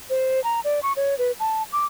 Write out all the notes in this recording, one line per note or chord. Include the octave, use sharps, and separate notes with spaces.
C5
A#5
D5
C#6
C#5
B4
A5
D6